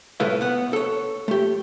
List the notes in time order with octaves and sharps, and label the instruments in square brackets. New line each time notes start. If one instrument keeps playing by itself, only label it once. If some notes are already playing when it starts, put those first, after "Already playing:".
[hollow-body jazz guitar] C2 A2 A3 E4 B4 F5
B3 F#5
A4 C#5
A3 G4